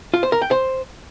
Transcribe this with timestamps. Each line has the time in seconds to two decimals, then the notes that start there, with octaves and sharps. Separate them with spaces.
0.14 F4
0.23 C5
0.32 A#4
0.42 G5
0.51 C5